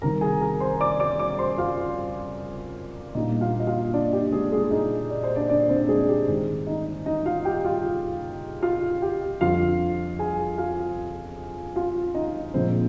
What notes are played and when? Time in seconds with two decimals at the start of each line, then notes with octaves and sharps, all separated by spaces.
0.02 C2 C3 D#3 A#4 A#5
0.21 G#4 G#5
0.41 A#4 A#5
0.60 C5 C6
0.80 D5 D6
1.00 D5 D6
1.19 D5 D6
1.39 C5 C6
1.58 F4 F5
3.15 A#2 G3 A#3 D4 D#4 D#5
3.41 F4 F5
3.60 D#5
3.67 F4 F5
3.93 D4 D5
4.13 G4
4.32 G#3 G#4
4.52 G#3 G#4
4.71 D#4 D#5
5.10 D5
5.24 C5
5.36 D4 D5
5.49 D4 D5
5.69 C4 C5
5.89 G#3 G#4
6.09 G4
6.27 G#2 D#3 G#3 C4
6.67 D#4 D#5
7.06 D#4 D#5
7.25 F4 F5
7.45 G4 G5
7.65 F4 F5
8.62 F4 F5
9.02 G4 G5
9.41 F2 D3 F3 F4 F5
10.19 G#4 G#5
10.58 F4 F5
11.76 F4 F5
12.15 D#4 D#5
12.54 A#2 F3 G#3 C4 D4 C5